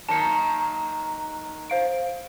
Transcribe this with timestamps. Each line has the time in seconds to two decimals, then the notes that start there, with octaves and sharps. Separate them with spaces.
0.09 D#3 F#3 A#3 A5 C#7
1.70 C5 F5 D7